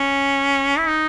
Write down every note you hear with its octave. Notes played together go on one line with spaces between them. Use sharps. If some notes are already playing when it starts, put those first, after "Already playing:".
Already playing: C#4
E4
D#4